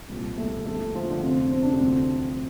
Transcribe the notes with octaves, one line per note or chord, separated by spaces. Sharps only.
C2 A#2 F3 G3 G4
A3 A4
D#2 D3 F3 A3 A4
F3 F4
D3 D4
F2 C3 F3 C4
C4
D4
C3 C4
D2 D3 F3